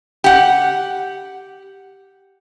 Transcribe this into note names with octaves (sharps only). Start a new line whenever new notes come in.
G4 F#5